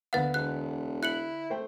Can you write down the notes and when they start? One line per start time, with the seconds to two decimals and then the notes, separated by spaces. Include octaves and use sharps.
0.13 D2 B3 F5 F#5 A6
0.34 E1 F#6
1.03 E4 F#6 C#7 F#7
1.50 A3 C5 G5